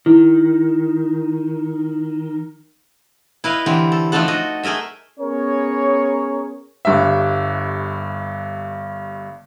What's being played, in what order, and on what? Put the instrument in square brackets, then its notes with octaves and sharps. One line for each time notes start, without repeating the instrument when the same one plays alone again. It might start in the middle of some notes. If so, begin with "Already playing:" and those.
[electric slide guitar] D#3 [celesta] E4
[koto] E4 B4 D#5 F5
D3 E3 C4 G4
A4
F3 A3 D4 D#4 A4 F#5
F#4 D#5
A3 G#4 A#4 D#5 E5
[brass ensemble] B3 C#4 G#4 A#4 C#5
[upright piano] G1 G2 E5